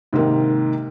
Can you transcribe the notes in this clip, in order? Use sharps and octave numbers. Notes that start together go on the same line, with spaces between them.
G#2 C3 D#3 A#3